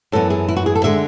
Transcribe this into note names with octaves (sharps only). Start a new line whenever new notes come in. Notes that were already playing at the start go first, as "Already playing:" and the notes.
F#2 E3 B3 A4
G#4
E4
F#4
G#4
A4
D3 G#3 E5